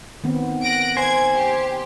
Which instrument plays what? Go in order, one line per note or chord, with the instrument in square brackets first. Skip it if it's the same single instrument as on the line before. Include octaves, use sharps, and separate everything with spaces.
[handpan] D#3 B3 C4
[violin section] F#6 A#6 D7
[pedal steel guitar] C5 G#5 [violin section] G#6
[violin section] G4